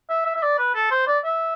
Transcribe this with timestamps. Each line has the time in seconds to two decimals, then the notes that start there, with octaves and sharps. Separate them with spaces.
0.10 E5
0.25 E5
0.36 E5
0.43 D5
0.59 B4
0.75 A4
0.91 C5
1.07 D5
1.24 E5